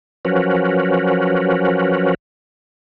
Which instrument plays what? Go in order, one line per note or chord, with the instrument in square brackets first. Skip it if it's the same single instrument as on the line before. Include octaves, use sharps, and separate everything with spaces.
[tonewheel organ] F3 F#3 C#4 F#4 A#4 B4